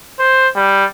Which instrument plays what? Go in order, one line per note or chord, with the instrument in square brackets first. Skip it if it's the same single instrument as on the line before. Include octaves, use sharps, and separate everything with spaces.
[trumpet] C5
G3